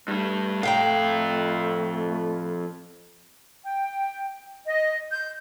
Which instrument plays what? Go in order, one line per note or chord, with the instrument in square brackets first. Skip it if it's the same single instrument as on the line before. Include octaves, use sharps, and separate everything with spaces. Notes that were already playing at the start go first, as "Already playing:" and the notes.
[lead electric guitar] G2 G3 [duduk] A3
[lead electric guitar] F2 F5 [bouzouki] A2 G5 A#5
[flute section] G5
D#5
G6